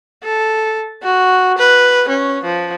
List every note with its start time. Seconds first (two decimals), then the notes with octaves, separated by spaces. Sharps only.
0.24 A4
1.03 F#4
1.58 B4
2.09 C#4
2.44 F3